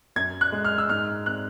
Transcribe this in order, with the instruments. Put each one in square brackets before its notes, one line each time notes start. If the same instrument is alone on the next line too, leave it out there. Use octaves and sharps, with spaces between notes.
[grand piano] F#2 G#6
F#6
G#3
F6
E6
G#2 F6
C4 F#6